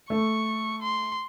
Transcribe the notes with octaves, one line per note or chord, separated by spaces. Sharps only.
A3 C#6
C6